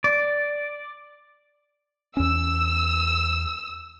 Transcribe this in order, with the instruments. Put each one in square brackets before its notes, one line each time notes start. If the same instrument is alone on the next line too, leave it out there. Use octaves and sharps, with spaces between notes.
[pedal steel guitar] D5
[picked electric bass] E2 C#4 [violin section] E6